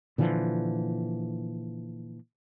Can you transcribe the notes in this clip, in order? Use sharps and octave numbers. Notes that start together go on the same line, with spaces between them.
A#2 D3 E3 F3